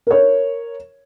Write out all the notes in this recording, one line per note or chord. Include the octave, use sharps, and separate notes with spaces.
A#4 C#5